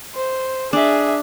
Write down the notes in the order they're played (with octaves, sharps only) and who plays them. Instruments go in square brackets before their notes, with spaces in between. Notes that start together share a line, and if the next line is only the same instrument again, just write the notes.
[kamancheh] C5
[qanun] D4 [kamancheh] G#4 E5